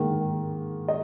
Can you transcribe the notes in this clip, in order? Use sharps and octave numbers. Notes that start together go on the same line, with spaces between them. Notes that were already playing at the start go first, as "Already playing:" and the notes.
Already playing: G#2 D#3 A#3
D#5